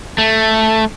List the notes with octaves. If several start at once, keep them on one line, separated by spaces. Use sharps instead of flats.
A3